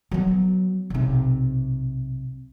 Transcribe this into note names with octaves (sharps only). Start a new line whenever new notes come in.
F#3 B3
B1 C3